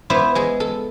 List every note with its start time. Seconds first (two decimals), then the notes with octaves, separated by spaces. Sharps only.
0.10 B3 E4 C5 D5
0.35 G#3 G#4
0.60 A4